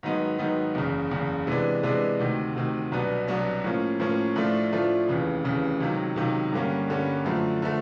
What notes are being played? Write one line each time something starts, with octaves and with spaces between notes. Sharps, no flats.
G#2 D#3 F#3 B3 D#4
G#2 D#3 F#3 B3 D#4
F#1 E2 C#3
F#1 E2 C#3
C3 E3 G#3 B3 D4
C3 E3 G#3 B3 D4
D2 C3 D#3
D2 C3 D#3
C2 B2 F#3 B3 D4
C2 B2 F#3 B3 D4
A2 F3 A#3 C#4
A2 F3 A#3 C#4
A2 F3 A3 D4 F4
A2 F3 A3 D4 F4
F1 D#2 C#3 E3
F1 D#2 C#3 E3
C#2 C3 D#3 F#3
C#2 C3 D#3 F#3
G2 D3 G3 A#3 C#4
G2 D3 G3 A#3 C#4
F#2 D3 F3 A3
D3 F3 A3